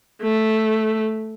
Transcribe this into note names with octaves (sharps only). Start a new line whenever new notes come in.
A3